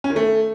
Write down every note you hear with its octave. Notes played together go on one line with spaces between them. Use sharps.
C#4
D#3
A3